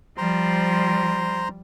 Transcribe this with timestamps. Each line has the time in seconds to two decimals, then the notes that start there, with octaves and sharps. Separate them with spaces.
0.18 F3 G3 C5 A#5 C6